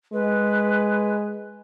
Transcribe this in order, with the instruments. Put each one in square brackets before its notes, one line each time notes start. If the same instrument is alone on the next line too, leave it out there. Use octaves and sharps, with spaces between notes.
[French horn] G#3 [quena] B4